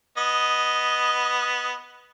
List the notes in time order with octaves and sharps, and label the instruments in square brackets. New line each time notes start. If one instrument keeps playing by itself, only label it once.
[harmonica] B3 D#5